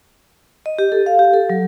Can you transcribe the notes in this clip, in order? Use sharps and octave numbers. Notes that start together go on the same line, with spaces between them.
D#5
G4
A4
F5
G4
A4
F#3